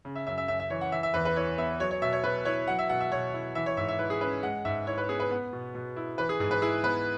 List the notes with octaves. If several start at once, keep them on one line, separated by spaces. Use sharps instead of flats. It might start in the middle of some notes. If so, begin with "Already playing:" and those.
C#3
E5
F#2 E5
E5
F#2 E5
E5
E3 C#5
F#5
E3 E5
E5
E2 B4
B4
E4 C#5
B3 E5
F#3 C#5
C#5
B2 E5
C#5
B2 B4
E4 C#5
F#3 F#5
E5
B2 F#5
E5
B2 C#5
E4
E3 E5
C#5
G#2 E5
E5
E4 B4
G#4
C#4 B4
G#3 F#5
G#2 E5
E4 C#5
B4
B3 G#4
B4
B3
B2
B2
E4
E3 B4
G#4
G#2 G#4
B4
E4 G#4
B3 B4